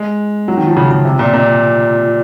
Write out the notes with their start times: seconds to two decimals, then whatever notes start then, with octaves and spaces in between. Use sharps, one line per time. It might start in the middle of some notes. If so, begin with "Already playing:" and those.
Already playing: G#3
0.48 F#3
0.57 D#3
0.67 F3
0.77 C#3
0.91 C#3
1.05 C3
1.19 A#2
1.34 A#2